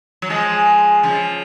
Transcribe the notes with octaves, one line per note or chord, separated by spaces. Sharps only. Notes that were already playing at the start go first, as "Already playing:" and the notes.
F#3
F3 G#3
C#3 F3